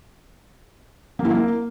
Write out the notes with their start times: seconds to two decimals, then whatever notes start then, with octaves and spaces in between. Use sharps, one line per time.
1.19 A#3
1.25 E4
1.31 A#3